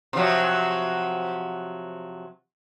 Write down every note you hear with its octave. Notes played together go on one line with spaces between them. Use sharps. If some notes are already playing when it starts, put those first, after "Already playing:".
C3 F3 F#3